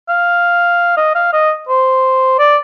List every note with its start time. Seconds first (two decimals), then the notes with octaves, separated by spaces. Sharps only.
0.09 F5
0.97 D#5
1.15 F5
1.33 D#5
1.69 C5
2.39 D5